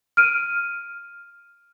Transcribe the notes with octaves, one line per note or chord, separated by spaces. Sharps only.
F6 D7 D#7